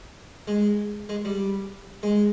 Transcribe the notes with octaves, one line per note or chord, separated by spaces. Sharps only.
G#3
G#3
G3
G#3